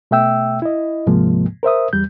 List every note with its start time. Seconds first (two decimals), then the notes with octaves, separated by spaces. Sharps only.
0.11 B2 A3 E5 G5 E6
0.62 E4 D#5
1.06 D2 G#2 C3 F3 G#3 A#3
1.63 A#4 C5 E5 D#6
1.93 E2 G3 G6